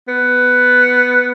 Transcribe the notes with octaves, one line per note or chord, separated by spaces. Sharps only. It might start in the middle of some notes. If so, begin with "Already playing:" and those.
B3